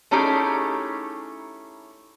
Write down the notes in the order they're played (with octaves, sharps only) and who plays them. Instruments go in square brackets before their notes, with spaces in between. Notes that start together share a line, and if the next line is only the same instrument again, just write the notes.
[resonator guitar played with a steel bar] A3 C#4 D#4 E4 G4 G#4